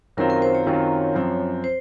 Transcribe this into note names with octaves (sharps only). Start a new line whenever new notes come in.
F#2 D#3 F#3 C4 F4 A#4
A#4
C5
C#5
F#2 D#3 F#3 C4 F4
F#2 F3 C4
C5